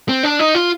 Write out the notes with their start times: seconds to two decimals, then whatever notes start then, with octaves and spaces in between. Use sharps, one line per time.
0.09 C4
0.23 D4
0.39 D#4
0.55 F4